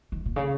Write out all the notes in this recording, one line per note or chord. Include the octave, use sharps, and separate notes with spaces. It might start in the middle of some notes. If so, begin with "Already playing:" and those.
D#3
A#2
C#3